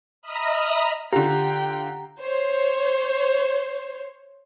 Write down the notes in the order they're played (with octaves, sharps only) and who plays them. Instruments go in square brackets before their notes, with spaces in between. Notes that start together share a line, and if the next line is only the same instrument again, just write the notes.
[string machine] D#5 E5 A#5 B5 D#6 F6
[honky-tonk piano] D3 F4 [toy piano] G4 [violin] G5 [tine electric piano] A#5
[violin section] C5 C#5